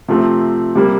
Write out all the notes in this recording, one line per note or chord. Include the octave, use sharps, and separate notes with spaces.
C3 F3 A3 C4
C3 G3 A#3